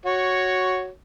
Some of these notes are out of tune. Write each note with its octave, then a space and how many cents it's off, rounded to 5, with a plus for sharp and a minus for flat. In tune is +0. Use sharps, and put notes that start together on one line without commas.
F#4 +0 C#5 +0